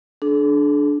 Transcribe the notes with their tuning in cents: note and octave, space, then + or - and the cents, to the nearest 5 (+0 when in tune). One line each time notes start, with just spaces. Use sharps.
D4 +0 A4 -45